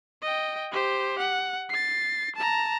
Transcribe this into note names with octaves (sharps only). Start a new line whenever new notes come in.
D#5 G5
G4 C5
F#5
A6 C7
A5 A#5